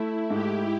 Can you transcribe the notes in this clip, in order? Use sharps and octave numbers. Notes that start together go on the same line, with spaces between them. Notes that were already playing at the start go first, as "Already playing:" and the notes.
Already playing: A3 E4
G#2 G4